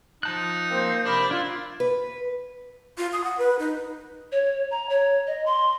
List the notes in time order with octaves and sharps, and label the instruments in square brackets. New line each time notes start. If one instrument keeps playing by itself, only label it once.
[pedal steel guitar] F3 A5 F#6 [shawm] D#4
[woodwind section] A#3 C4 C5
[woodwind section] C3 A#4 B5 [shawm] D4
[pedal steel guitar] D4 [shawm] E4 [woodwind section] F4
[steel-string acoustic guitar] B4
[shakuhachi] F4
D#6
F#5
B4
D#4
[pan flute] C#5
A#5
C#5
D#5
C6